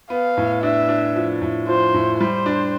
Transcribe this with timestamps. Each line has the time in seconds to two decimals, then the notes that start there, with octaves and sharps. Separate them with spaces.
0.10 B3 F5
0.37 A2
0.63 D4 E5
0.89 D4
1.15 F3
1.42 A2
1.68 F3 C5
1.94 A2
2.20 G3 C5
2.46 D4